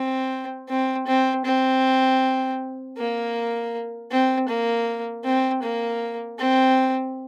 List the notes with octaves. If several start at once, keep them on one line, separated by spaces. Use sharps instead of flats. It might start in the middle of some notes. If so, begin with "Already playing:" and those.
Already playing: C4
C4
C4
C4
A#3
C4
A#3
C4
A#3
C4